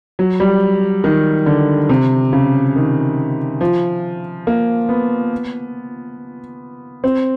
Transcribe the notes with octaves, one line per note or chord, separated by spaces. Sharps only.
F#3
G3
D#3
D3
C3
C#3
D#3
F3
A#3
B3
C4